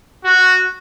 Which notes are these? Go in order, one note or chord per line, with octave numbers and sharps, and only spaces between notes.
F#4